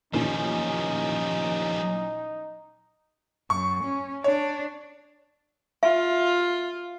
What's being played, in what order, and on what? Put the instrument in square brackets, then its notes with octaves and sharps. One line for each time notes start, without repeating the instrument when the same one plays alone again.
[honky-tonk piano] A1 A#2 D#3 [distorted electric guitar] F3 G3 [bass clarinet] C#4 [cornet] D#4
[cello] F#2 [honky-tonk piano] C#6
[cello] C#4
[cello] D4 [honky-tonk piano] C#5
[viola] F4 [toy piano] E5